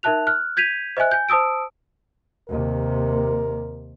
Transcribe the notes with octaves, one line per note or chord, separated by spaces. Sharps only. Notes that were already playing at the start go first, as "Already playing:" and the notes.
D#4 A#4 E5 A5 F#6 F7
F6 F#6
G6 G#6 B6 D#7 F7
C5 D#5 E5 G#5 F#6
G#5 G6
C5 A5 D#6 E6 D7
D#2 C3 A#4